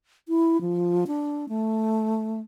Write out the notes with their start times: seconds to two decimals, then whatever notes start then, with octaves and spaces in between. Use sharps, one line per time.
0.29 E4
0.61 F3
1.07 D4
1.49 A3